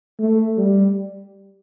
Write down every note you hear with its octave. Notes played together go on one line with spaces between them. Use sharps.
A3
G3